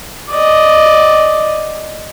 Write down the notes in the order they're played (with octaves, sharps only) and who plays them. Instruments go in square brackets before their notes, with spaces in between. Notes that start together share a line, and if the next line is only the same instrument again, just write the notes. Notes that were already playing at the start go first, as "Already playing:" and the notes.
[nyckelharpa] D5 D#5